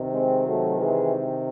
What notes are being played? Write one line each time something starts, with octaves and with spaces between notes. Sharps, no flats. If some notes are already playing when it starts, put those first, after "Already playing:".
Already playing: C3 D#3
G#3 C4
F#3 A3
E3 G#3